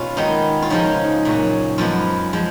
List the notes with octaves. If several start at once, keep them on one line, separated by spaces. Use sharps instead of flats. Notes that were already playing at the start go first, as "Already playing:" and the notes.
Already playing: B2 C#4 F4
D#3 G#3 B3 D#4
F4
C#3 F3 G#3 D#4
A#2 F#3 C#4
F#2 F3 G#3 B3 F4
F3 G#3